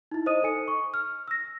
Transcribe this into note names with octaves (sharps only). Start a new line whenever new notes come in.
D#4 E4
C5 D#5 D#6 D#7
D#4 A4 G#5 C#7
C#6
F6
E6 A#6